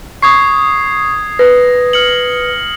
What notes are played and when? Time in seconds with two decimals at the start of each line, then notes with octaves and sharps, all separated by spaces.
0.22 C#6 D#6 G#6 C7
1.39 B4 A#6
1.93 F6 C#7 F#7